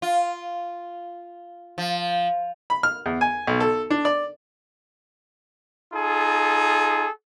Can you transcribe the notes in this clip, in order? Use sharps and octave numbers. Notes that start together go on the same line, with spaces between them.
F4
F3
B5
F6
E2
G#5
B1
A4
D4
D5
D#4 F4 G#4 A4